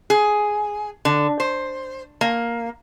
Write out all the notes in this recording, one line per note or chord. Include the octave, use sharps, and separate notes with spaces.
G#4
D3
C5
A#3